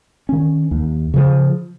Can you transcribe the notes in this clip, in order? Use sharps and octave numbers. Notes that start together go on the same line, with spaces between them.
D#3 C#4
D#2
C#3 F3